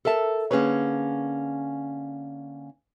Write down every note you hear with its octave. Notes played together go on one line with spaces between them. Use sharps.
A4 A#4 E5 A5
D3 A#3 C#4 G#4 B4 C#5